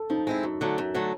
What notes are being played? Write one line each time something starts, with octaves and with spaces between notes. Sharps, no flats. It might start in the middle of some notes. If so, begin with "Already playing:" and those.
Already playing: A4
F3 D#4
G#3 C4 E4
F#2
D3 F#3 A3
F#2
D3 F#3 A3